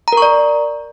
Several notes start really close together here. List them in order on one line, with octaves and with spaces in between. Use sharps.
A#5 A#4 C#6 D5